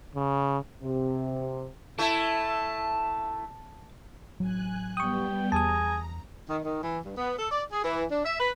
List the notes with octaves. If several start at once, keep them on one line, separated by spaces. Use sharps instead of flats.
C#3
C3
A3 E4 A5
A1 F#3 G#5 F#6
G3 B3 G5 C#6 D#6
E2 G#4 A5 A#5 D#6
D#3
D#3
E3
G2
B3
A4
D5
G#4
E3
D4
E5
B4